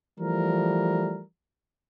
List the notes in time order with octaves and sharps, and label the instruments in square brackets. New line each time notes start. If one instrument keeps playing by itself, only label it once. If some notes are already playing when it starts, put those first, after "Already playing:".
[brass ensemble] E3 F3 G3 A3 A#4